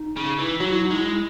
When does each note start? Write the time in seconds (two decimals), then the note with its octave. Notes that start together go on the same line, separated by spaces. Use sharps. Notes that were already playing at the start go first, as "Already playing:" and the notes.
Already playing: D#4
0.16 C#3
0.39 E3
0.60 F#3 F#4
0.72 E4
0.85 D#4
0.91 G#3
0.97 E4